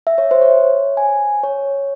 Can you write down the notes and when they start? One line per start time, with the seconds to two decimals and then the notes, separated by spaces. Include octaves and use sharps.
0.07 E5
0.18 C#5
0.31 C5
0.42 C#5
0.97 G#5
1.43 C#5